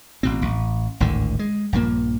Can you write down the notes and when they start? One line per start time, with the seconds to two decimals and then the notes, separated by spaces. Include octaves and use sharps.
0.23 A1 B2 C4
0.42 A1
1.00 G#1 D2 A2 D3
1.39 G#3
1.73 A#1 G2 F3 A#3